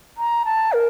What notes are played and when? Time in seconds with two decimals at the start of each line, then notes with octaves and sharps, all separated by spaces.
0.18 A#5
0.45 A5
0.73 A#4